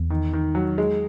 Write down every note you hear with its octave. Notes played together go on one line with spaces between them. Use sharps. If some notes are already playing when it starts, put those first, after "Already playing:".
Already playing: E2
D#3
D#3
F#3
G#3